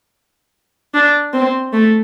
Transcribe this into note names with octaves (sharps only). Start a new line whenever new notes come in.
D4
C4
A3